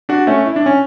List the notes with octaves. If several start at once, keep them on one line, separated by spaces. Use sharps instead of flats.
D4 F#4
A3 C#4
E4
D4
C#4